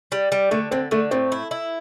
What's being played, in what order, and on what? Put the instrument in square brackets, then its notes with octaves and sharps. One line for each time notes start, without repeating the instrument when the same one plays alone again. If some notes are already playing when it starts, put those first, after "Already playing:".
[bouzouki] G3
G3
[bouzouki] D3 [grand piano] A3
[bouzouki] D3 [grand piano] C4
[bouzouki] D3 [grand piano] A3
[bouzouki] A2 [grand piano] C4
[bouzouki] E4
E4